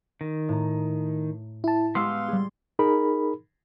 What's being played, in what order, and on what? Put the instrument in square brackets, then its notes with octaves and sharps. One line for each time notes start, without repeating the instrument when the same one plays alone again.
[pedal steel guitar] D#3
[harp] A2 A#5
[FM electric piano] E4 A5
[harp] G#3 G4 D6 [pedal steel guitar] B3 F5 E6 [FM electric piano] C6
[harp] G3 G#4
[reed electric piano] D#4 G#4 A#4 B5